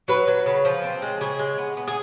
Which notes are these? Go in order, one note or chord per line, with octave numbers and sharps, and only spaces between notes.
F#3 B4
F#3
C#3
F3
C4
G#3
C#3 G#4
G#3
B3
B3
G#4